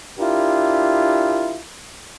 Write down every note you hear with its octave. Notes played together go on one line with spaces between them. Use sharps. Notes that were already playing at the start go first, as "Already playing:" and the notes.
D4 E4 F4 G4 A#4